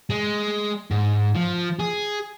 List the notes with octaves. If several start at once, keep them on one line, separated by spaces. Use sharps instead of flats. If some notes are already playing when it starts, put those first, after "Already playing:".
G#3
G#2
F3
G#4